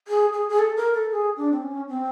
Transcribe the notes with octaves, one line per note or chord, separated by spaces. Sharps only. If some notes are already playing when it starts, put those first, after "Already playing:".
G#4
G#4
G#4
A4
A#4
A4
G#4
D4
C4
C#4
C4